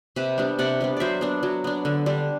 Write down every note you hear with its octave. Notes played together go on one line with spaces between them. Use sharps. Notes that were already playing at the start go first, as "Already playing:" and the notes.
C3 G4 B4
G3 B3 D4
C3 D5 F#5
G3 B3 D4
F#3 C5 D5 E5
B3 D4
F#3
B3 D4
D3
G3 D4